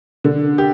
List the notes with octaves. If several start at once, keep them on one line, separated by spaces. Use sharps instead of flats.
D3
G4